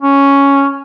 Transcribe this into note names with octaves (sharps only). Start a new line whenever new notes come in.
C#4